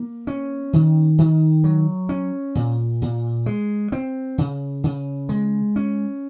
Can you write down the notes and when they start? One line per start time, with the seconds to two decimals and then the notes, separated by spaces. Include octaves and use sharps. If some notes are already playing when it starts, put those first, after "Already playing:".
Already playing: A#3
0.27 C#4
0.73 D#3
1.18 D#3
1.64 F#3
2.09 C#4
2.55 A#2
3.02 A#2
3.46 G#3
3.92 C4
4.38 C#3
4.84 C#3
5.29 G#3
5.76 C#4